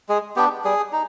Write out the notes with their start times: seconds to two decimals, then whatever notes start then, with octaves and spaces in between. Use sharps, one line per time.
0.09 G#3 G#4
0.36 B3 D4 G4
0.65 G3 G#4
0.92 D#4